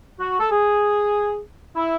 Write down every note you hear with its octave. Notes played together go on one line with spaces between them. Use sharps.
F#4
A4
G#4
E4